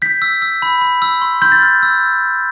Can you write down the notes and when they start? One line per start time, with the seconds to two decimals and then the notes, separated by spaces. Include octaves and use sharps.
0.02 G6 B6
0.22 E6
0.42 E6
0.62 B5
0.81 B5
1.02 E6
1.22 C6
1.42 C6 G6
1.52 A6
1.62 F6
1.83 E6